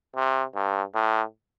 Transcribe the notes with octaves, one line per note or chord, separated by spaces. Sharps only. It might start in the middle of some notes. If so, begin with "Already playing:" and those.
C3
G2
A2